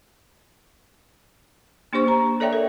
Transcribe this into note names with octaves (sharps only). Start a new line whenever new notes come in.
A#3 D4 G4 C5 C#6
A#5
A4 C#5 D5 E5 G5
A#4